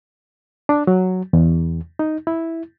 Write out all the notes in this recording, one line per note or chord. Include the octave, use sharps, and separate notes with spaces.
D4
F#3
E2
D#4
E4